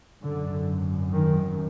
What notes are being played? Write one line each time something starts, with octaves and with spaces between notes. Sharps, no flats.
G#1 F#2 D3
D#3